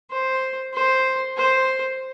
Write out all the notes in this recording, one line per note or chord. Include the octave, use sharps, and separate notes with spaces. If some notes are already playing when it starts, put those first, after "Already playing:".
C5
C5
C5